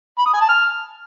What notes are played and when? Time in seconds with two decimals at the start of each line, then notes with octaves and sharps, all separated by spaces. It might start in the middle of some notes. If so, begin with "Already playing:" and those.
0.18 B5
0.26 D#6
0.33 G#5
0.41 A5
0.49 F6